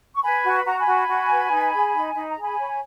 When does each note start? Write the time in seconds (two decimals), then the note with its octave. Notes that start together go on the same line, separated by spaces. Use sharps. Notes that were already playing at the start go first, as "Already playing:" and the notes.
0.15 C#6
0.23 B4 G#5 B5
0.45 F#4
0.55 B5
0.65 F#4 A#5
0.79 G#5 B5
0.87 F#4
1.08 F#4
1.30 B4
1.51 D#4
1.72 G#4
1.93 D#4
2.15 D#4 B5
2.29 A#5
2.36 G#4
2.42 G#5 B5
2.58 C#5